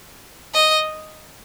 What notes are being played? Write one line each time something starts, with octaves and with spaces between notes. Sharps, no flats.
D#5